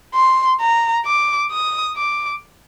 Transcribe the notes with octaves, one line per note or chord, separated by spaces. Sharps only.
C6
A#5
D6
D#6
D6